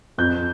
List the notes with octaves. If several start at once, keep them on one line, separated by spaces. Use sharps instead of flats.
F2 G6